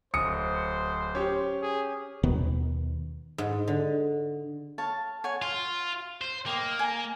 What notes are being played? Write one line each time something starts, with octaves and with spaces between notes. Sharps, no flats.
D1 C5 D#6 C#7
C#4 G4
G#4
D#2 B2 D#3 B3
G#2
D3
C#5 F5 A5
C#5 F#5 G#5
F4 F5
C5
A#3 D#5 G5
G#5 A#5